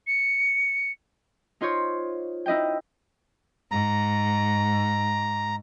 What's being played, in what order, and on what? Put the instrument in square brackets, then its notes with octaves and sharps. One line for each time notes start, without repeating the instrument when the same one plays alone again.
[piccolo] C#7
[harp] D#4 F4 C5 C#5
D#4 E4 D#5 F5 G5
[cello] G#2 [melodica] A#5